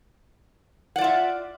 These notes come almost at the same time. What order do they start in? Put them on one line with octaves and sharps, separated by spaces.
F#5 D5 F4 E5